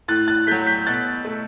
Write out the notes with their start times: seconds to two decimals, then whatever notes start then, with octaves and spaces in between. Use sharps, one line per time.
0.08 A2 F#6 A6
0.28 F#6 A6
0.47 F#3 A3 G6 B6
0.67 G6 B6
0.86 B2 F#6 A6
1.25 A3